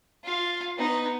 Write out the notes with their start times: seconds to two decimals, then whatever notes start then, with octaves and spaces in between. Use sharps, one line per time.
0.24 F4 F5
0.77 B3 D#4